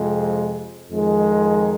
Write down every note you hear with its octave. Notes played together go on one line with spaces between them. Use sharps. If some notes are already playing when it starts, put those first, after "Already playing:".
Already playing: F2 C3 G#3
F2 D#3 G#3